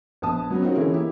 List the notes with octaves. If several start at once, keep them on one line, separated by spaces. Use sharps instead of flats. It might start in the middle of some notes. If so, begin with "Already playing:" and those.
A#1 B3 A5 D#6
F#3 B3 C#4
C4 C#4 D#4 F4 F#4 A#4
D3 E3 C#4 E4 G#4 A#4
A#3 E4 G4